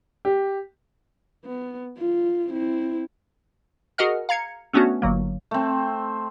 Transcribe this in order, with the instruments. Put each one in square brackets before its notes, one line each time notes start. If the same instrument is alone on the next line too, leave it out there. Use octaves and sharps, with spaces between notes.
[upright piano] G4
[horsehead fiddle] B3
F4
C4 E4
[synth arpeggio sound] F#4 G#4 A#4 D#5 F#5 F6
F5 A#5 G#6 C#7
A3 B3 C#4 D4 F#4
G1 F#3 A#3
[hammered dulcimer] A3 C4